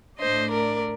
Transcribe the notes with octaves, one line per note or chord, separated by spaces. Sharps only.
A2 A3 D4 C5 D#5
A#4 D5